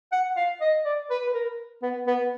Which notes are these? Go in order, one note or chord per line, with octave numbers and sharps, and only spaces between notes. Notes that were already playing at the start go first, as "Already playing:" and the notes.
F#5
F5
D#5
D5
B4
B4
A#4
B3
B3